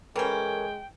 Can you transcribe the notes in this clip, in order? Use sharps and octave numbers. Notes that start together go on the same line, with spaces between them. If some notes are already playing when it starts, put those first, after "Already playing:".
E3 G#3 C#4 A4 A#4 G5 G#6